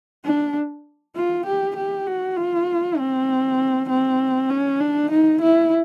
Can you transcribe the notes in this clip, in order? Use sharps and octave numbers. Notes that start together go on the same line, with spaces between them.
D4
F4
G4
G4
F#4
F4
C4
C4
C#4
D4
D#4
E4